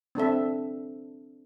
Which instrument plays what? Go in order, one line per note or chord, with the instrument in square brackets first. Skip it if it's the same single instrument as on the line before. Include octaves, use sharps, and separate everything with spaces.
[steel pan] C4 D4 A4 E5